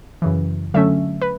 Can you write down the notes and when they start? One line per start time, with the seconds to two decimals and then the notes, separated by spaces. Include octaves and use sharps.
0.22 F#2 C#3 E3
0.74 D3 F#3 A3 C#4 E5
1.22 B4